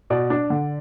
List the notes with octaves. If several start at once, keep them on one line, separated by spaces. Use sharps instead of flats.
B2 D5
D4
D3